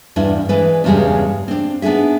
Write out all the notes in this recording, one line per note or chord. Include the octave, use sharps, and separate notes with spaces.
E2 G2 D4 E4
E3 G#3 B4 D5
E2 G2 C#3 G3 G#3
C4 D4
B3 D4 D#4 G#4 E5